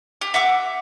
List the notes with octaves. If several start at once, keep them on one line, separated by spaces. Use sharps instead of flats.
G4
E5 F#5 D6